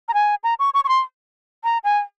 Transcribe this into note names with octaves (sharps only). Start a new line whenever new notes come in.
A#5
G#5
A#5
C#6
C#6
C#6
C6
A#5
G#5